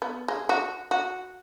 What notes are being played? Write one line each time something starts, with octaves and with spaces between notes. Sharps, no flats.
B3
G#3
F#4
F#4